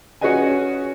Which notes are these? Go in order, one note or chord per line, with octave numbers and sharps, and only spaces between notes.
C#4 F#4 G#4 B4 D#5 G#5